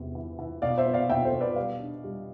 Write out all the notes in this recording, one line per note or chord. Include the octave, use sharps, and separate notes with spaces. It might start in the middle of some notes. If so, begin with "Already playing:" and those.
Already playing: E2 G2 C3
E3
E3
B2 D5 F5
C5 E5
B3
D5 F5
B2 E5 G5
A4 C5
B2
B4 D5
G3 D5 F5
D4
G3